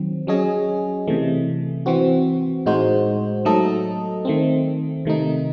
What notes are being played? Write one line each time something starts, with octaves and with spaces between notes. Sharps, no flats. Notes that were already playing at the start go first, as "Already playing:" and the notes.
Already playing: D#3 F#3 C4
F#3 C#4 G#4 D#5
C3 E3 A3
E3 C4 F#4
A2 G#3 D#4 F#4 C5
F#3 A3 D#4 A4 D#5
D#3 A3 C4
C3 D#3 A3 D#4